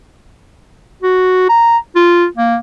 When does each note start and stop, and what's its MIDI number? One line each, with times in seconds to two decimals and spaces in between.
1.03 1.48 66
1.49 1.77 82
1.95 2.26 65
2.37 2.57 58